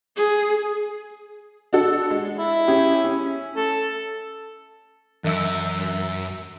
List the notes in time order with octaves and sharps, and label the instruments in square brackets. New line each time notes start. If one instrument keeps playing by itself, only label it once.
[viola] G#4
[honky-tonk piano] D4 F#4 A4
G#3
[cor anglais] E4
[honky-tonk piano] C#4 G4 G#4
C#4
[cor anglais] A4
[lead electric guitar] F#2 [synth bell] E3 E5 E6